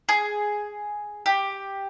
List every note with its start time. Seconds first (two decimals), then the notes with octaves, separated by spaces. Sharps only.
0.09 G#4
1.26 G4